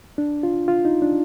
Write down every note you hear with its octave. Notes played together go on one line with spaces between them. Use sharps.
D4
F4
F4
D#4
D4